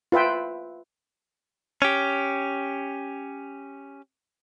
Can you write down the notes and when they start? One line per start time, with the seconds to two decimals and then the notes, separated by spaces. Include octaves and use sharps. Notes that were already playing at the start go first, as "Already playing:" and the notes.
0.12 F4 B4 E5 G5
1.82 C#4 G4